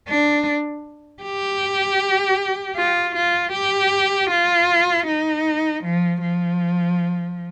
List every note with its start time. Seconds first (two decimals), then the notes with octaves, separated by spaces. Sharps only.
0.08 D4
1.23 G4
2.76 F4
3.15 F4
3.53 G4
4.30 F4
5.07 D#4
5.84 F3
6.22 F3